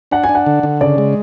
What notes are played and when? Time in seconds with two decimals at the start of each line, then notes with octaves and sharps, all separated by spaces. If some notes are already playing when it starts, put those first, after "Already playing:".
0.11 D4 F#5
0.23 G#5
0.29 D4
0.35 F#5
0.46 D3
0.63 D3
0.81 C#3 D5
0.98 G#3